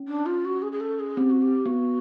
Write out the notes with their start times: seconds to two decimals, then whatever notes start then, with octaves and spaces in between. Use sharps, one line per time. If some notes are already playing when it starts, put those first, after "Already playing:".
Already playing: C#4
0.08 D4
0.26 F4
0.45 F#4
0.62 G#4
0.72 G#4
0.80 A4
1.00 G#4
1.17 C4 G4
1.30 F#4
1.42 G4
1.66 B3 F#4